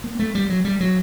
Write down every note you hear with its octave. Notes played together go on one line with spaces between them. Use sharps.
A#3
A3
G3
F#3
G3
F#3